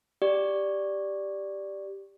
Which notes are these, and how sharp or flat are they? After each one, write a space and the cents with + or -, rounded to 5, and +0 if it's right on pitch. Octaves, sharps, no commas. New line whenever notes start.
G4 +0 D5 +0